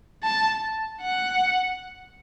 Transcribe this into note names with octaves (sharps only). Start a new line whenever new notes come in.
A5
F#5